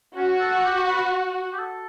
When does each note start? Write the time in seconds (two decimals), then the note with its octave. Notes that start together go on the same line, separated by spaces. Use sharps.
0.17 C#4 F#4
0.40 A4
0.64 G4
0.88 B4
1.53 G4
1.59 A4